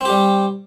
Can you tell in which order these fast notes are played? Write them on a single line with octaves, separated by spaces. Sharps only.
C4 G4 G3